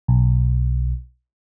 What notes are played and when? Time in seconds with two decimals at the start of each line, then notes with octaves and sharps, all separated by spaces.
0.08 B1